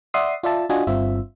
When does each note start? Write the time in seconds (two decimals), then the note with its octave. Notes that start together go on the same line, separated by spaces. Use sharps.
0.14 D5 E5 F#5 C6 D#6 C7
0.43 F4 D5 E5 A5
0.70 D4 F4 F#4 D#5 G#5
0.87 G1 G2 C4 F4 E5